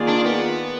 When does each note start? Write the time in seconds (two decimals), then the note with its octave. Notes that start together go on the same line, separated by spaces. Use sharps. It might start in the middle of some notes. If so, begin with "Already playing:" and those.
Already playing: D#3 A#3 F4 G#4 D5
0.08 D4
0.26 B3